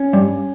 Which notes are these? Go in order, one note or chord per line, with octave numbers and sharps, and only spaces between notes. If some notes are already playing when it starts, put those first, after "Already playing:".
Already playing: C#4
G2